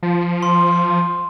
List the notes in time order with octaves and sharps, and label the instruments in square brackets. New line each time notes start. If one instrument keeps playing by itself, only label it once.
[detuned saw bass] F3
[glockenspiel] C6